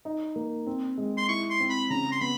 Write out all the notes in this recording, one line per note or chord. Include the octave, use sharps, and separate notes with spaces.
D#4
A#3
C4
G#3
C6
E4 C#6
C6
C4
B5
C#3 A#5
C6
B3 B5